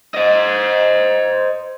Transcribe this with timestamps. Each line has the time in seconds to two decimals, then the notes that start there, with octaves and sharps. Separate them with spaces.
0.14 C5 D#5